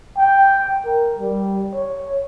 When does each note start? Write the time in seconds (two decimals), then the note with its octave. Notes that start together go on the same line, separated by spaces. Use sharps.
0.18 G5
0.85 A#4
1.19 G3
1.74 C#5